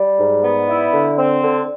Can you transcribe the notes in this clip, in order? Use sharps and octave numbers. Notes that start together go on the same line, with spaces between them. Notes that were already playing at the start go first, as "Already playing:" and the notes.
Already playing: G3 D5
G#2
B3
E4
D3
C4
D3